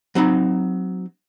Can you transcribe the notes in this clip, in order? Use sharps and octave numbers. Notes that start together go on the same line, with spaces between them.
F#3 C4 D#4 B5